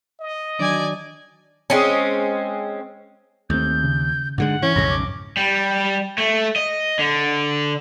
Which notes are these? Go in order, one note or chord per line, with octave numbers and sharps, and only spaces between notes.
D#5
D#3 F#3 D4 D5 G#5
G#3 C4 C#4
D#2 A3 C4 G6
C#3
G#2 D3 G#3 F#5
E3 C#4
B1 F2 G#2 C#3 A#6
D6
G3
A3
D#5
D3